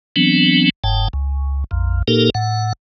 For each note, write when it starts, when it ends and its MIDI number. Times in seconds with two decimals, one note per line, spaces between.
0.16 0.70 52
0.16 0.70 54
0.16 0.70 59
0.16 0.70 60
0.16 0.70 62
0.84 1.08 30
0.84 1.08 44
0.84 1.08 79
0.84 1.08 81
1.13 1.64 37
1.71 2.02 34
1.71 2.02 41
2.08 2.30 46
2.08 2.30 58
2.08 2.30 63
2.08 2.30 67
2.08 2.30 69
2.08 2.30 70
2.35 2.73 45
2.35 2.73 78